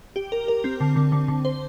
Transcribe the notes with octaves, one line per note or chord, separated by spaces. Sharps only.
G4
A#4
A#4
C4
D3
D3
D3
D3
C5